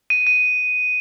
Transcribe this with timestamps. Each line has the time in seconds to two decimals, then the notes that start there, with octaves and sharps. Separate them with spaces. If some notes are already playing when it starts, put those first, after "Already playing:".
0.10 D#7
0.27 D#7